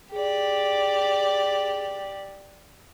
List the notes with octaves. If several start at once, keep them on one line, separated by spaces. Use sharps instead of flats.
G4 G#4 D5